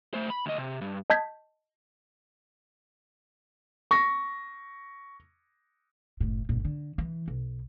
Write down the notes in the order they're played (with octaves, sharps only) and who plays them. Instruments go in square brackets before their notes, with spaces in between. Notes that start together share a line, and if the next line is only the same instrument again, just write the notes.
[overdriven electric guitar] A3 C5
B5
D2 D#5
C3
G2
[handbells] D#5 A5 G6 G#6 B6
[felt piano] C#6 A#6
[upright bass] F#1 A2
G1 A#2
D3
E3
B1